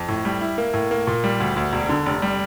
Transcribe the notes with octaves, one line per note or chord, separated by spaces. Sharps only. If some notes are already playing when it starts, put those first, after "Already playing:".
Already playing: F2
A2
G3
E4
A#3
A2
A#3
A#2
G3
D2
D2
E1
D3
F1
G3